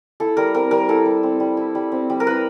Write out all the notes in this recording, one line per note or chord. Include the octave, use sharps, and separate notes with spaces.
E4 A4
G3 A#4
C4 A#4
G3 A#4
E4 A4
G3
C4
G3
E4
G3
C4
G3
A#4
E4 B4